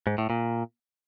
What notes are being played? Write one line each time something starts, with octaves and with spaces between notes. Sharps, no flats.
G#2
A2
A#2